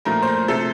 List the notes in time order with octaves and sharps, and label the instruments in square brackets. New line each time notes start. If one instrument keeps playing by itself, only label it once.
[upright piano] A#2 F3 A3 A#4
C5
A#4
C3 F3 A3 A4